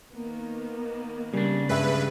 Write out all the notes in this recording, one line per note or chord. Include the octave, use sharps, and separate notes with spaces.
D#3 A#3 B3
C#3 G3 D4
G2 G#3 G#4 B4 E5